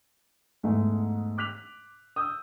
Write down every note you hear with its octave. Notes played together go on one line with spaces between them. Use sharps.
E2 G#2 G#3 A3
D6 F#6 B6 F7
D#6 E6 G6